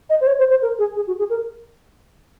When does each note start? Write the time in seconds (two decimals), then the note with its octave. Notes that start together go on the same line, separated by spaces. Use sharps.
0.10 D#5
0.21 C5
0.27 C#5
0.39 C5
0.50 C5
0.62 A#4
0.79 G#4
0.96 G#4
1.07 F#4
1.19 G#4
1.30 A#4